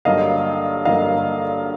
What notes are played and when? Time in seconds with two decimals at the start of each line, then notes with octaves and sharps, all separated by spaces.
0.05 G2 D3 F#3 A#3 D#5 F5
0.85 G2 D3 F#3 A#3 D#5 F5